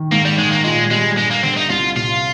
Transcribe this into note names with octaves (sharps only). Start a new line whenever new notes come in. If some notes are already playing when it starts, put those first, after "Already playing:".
Already playing: D#3
G#2 A#3
G3
D#3 G#3
A#3
A#2 G#3
G3 G#3
G2 G#3
A#3
D3 C4
D#4
C2 F4
C3 F4